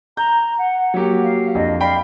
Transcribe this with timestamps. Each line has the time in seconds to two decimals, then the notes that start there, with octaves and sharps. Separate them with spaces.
0.17 A#5 G6
0.58 F#5
0.94 F#3 A#3 G4
1.23 F5
1.55 F2 D4 D#5
1.80 D5 F5 G5 B5